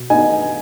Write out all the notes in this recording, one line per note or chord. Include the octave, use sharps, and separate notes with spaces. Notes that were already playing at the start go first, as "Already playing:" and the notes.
Already playing: B2
B3 D#4 G#5